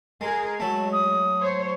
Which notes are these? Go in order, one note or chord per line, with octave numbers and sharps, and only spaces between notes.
G#3 G#4 A#4
F#3 G#3 A3 A5
D#6
C5 C#5